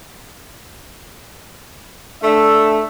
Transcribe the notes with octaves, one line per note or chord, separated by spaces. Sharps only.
A3 D4 E5